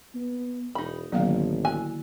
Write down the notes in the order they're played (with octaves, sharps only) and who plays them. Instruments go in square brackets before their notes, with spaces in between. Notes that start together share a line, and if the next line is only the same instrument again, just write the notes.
[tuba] B3
[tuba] E1 [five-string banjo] D#4 B5
[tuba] A1 [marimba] D3 D#3 A#3 [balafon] F#3 B3 F5
[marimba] E4 F#4 [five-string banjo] G#5